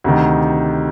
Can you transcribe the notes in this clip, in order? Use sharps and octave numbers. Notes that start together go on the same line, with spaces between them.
D2 C3 D#3